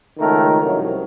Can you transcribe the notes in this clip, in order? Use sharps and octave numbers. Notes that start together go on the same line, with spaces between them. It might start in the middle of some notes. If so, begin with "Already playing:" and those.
C#2 D#3 A3 A#4
C2 F#2 F3 F#3